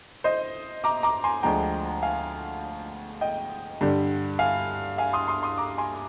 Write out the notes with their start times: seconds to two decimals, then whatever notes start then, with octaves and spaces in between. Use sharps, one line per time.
0.24 C5 D#5
0.84 A#5 D6
1.03 A#5 D6
1.24 G#5 C6
1.43 D2 D3 F3 G#3 G5 A#5
2.02 F5 G#5
3.21 D#5 G5
3.81 G2 D3 G3
4.39 F5 G#5
4.98 F5 G#5
5.13 C6 D#6
5.28 C6 D#6
5.43 C6 D#6
5.58 A#5 D6
5.78 G#5 C6